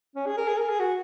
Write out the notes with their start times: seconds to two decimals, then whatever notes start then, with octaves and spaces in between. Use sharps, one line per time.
0.16 C#4
0.26 G#4
0.37 A#4
0.48 G#4
0.57 A#4
0.69 G#4
0.80 F#4